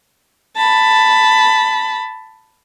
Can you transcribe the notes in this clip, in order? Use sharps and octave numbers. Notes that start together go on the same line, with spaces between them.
A5 B5